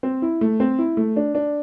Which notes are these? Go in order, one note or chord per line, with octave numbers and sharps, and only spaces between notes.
C4
E4
A3
C4
E4
A3
D4
D4